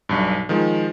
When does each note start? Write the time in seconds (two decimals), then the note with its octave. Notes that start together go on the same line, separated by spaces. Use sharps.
0.09 B1 G2
0.49 D#3 F3 G#3